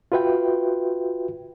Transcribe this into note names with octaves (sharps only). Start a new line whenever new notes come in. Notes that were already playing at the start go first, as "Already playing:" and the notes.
F4 F#4 B4 E5 G5